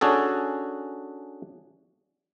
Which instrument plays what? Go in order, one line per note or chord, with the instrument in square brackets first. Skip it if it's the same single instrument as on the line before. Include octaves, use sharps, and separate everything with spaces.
[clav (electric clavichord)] C#4 D4 F#4 G#4 A4